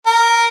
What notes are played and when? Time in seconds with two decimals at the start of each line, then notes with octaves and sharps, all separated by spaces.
0.07 A#4